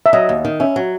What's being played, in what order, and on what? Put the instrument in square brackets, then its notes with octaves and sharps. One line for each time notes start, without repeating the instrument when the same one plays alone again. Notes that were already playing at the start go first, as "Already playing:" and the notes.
[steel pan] E5
[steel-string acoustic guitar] F#3 [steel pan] D#5
[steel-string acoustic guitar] D#2
D#3
[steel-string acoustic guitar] C#4 [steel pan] E5
[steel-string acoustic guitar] F#3